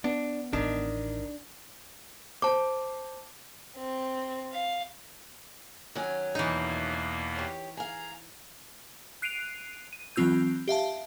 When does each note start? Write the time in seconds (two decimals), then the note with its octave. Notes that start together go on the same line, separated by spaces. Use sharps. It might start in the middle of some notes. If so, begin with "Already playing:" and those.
0.04 B3 D4
0.53 A1 D#3 D4
2.42 C5 A5 D6
3.78 C4
4.53 F5
5.95 D#3 F#3 C#4
6.35 E2 B2 E3 A#3 D#4
7.36 G4 C#5
7.77 G#4 F5 A#5
9.22 F#6 C7 D7 D#7 F7
9.93 D#7
10.16 E3 F#3 C4 F4 E6 G6
10.68 G4 E5 F5 A5